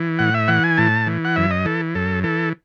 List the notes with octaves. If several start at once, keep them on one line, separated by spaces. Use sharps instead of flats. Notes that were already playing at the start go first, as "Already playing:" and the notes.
Already playing: E3
A2 F#5
E5
E3 F#5
G#5
A2 A5
E3
F#5
F#2 E5
D#5
E3 A4
F#2 A4
E3 A4